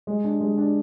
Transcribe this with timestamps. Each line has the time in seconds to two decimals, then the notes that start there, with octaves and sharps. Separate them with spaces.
0.07 G#3
0.24 D4
0.41 G#3
0.58 D4